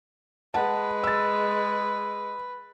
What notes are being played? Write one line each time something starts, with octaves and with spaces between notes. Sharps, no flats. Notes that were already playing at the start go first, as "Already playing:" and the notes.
G#3 B4 F#5 A5
E6 A6